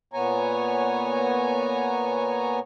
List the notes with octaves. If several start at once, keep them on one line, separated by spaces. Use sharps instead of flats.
A#2 B3 C#5 G#5 A#5